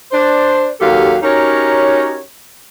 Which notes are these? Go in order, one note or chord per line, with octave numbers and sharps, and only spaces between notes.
D4 C5
D#2 F#3 C#4 G4 A4 F5
C#4 D#4 F#4 G4 A#4 C#5